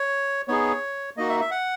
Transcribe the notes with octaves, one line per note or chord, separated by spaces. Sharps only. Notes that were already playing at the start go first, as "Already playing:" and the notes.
Already playing: C#5
B3 D#4 G#4 C#5
A#3 D#4 F#4 D#5
E5
E5
F#5